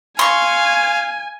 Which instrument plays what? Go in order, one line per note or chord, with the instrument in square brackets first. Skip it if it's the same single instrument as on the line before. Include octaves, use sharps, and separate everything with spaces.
[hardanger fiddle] F5 [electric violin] G#5 [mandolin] C6 C#6